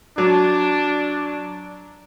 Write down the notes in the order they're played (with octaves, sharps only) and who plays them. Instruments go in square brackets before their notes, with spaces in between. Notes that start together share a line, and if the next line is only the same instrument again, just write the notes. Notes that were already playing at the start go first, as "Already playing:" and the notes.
[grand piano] F#3 [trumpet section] D4